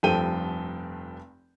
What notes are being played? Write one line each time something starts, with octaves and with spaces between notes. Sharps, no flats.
F1 G2 F3 A4 G5 D#7